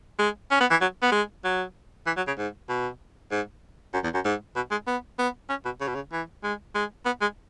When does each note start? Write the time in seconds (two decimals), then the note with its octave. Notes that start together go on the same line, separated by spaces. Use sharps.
0.19 G#3
0.51 C#4
0.60 B3
0.71 E3
0.81 F#3
1.02 B3
1.12 G#3
1.44 F#3
2.06 E3
2.17 F#3
2.27 C#3
2.38 G#2
2.69 B2
3.31 G#2
3.93 F#2
4.04 E2
4.14 F#2
4.25 G#2
4.56 B2
4.71 G#3
4.87 B3
5.19 B3
5.49 C#4
5.65 B2
5.81 C#3
5.87 B2
5.95 C#3
6.12 E3
6.43 G#3
6.75 G#3
7.06 B3
7.21 G#3